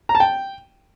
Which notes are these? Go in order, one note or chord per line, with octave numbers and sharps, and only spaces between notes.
A#5
A5
G5